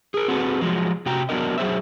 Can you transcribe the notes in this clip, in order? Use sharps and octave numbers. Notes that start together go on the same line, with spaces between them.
G#4 A#4
C4 F#4 G#4 A4 B4
F3 F#3 G#3
C3 F#4 G5 A#5
F#3 B3 D4 A#4 D#5
F#3 G#4 C5 E5